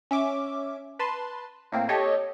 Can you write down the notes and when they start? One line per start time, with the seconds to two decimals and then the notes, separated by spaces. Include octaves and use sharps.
0.11 C#4 E5 D6
0.99 B4 A5 C6
1.72 A2 A#3 C4
1.89 G4 A4 C#5 D#5